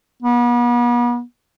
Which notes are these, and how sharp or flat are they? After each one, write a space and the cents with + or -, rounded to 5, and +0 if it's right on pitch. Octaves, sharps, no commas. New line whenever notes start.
B3 -40